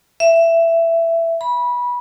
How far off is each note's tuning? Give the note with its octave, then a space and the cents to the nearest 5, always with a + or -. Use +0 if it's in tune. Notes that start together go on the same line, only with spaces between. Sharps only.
E5 +15
B5 -20